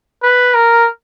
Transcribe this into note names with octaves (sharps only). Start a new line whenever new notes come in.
B4
A#4